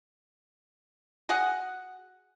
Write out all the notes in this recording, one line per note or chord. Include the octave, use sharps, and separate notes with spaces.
F#4 G#4 D#5 F#5